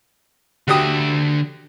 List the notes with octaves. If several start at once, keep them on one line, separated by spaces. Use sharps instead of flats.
D3 F#4 G4 E5 D#6